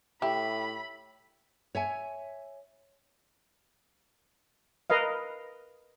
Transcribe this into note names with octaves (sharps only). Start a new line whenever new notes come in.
A2 G4 E5 B5
C#5 E5 G#5
A#4 B4 D#5 F5